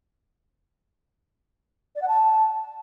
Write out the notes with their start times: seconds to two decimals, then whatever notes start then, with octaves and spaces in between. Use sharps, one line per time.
1.95 D5
2.01 F#5
2.07 A5